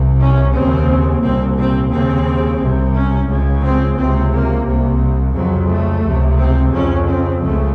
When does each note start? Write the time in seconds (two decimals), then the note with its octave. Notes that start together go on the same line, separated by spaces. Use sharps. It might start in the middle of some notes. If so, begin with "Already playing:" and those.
Already playing: C2 C3
0.20 C#4
0.53 D#2 C#3 C4
1.22 C2 A#2 C4
1.57 C4
1.91 D#2 C#3 C4
2.60 C2 C3
2.94 C#4
3.29 C#2 C#3
3.63 C4
3.98 C#2 C3 C4
4.32 A#3
4.67 C2 C3
5.35 F2 C#3 F#3
5.70 A3
6.04 C#2 C3
6.39 C4
6.72 F2 C#3 C#4
7.07 C4
7.42 C#2 C#3 A3